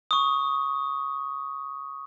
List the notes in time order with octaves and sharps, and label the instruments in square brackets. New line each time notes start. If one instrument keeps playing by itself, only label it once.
[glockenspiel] C#6 D#6